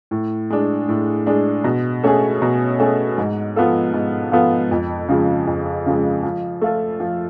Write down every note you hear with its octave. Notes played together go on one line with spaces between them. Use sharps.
A2
G#3 D4
A2
G#3 D4
B2
A3 C#4 G#4
B2
A3 C#4 G#4
G#2
F3 B3 F4 A4
G#2
F3 B3 F4 A4
F2
C#3 F3 G#3
F2
C#3 F3 G#3
F3
A3 F4 A4
F3